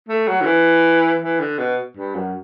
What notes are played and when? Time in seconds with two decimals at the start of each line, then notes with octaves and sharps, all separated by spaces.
0.09 A3
0.28 F#3
0.42 D3
0.46 E3
1.22 E3
1.40 D3
1.59 B2
1.97 G2
2.16 F#2